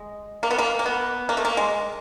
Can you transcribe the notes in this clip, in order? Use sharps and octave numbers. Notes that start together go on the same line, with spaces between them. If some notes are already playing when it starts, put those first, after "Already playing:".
Already playing: G#3
A#3
B3
A#3
A#3
B3
A#3
A3
A#3
G#3